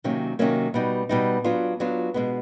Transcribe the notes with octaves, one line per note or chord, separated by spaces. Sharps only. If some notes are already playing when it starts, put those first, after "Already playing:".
C3 D#3 F#3 A#3 C#4
C3 D#3 F#3 A#3 C#4
B2 G3 B3 D#4
B2 G3 B3 D#4
F#3 B3 D4 F4
F#3 B3 D4 F4
B2 G#3 B3